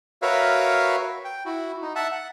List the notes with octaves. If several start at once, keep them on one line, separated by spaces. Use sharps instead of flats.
F#4 A#4 B4 C#5 E5 F5
G5
E4 F#4
D#4
E5 F#5 A5
F#5